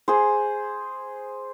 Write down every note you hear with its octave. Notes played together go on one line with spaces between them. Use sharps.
G#4 C5